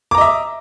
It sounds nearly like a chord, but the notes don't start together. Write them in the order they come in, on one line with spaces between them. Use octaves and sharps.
D6 A#5 D#5 E5